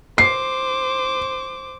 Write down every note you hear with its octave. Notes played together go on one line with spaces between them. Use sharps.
C5 D6 C7